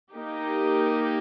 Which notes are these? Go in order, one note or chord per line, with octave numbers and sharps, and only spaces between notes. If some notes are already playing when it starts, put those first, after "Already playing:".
A#3 D#4 G4